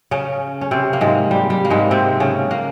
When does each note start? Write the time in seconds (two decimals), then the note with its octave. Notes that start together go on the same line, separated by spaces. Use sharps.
0.11 C#3 C#4
0.61 C#4
0.71 C3 C4
0.93 A#3
1.01 G#2 G#3
1.31 G3
1.50 G3
1.65 A#3
1.70 G#2 G#3
1.91 C3 C4
2.20 C#3 C#4
2.51 A#3